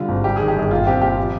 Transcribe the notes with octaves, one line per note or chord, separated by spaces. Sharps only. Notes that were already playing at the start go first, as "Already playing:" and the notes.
Already playing: D3 G3 F4
G#1
G3 G4
D#3 G#4
G4
G1 G#4
A#2 F4
C4 G4
A#2 G4
F3